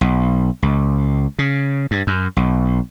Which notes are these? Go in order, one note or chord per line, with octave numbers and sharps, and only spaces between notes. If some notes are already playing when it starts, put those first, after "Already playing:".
B1
C#2
C#3
G2
F#2
B1